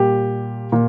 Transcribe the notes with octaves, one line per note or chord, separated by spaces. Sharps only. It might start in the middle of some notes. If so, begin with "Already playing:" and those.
Already playing: A#2 G3 G4
A#2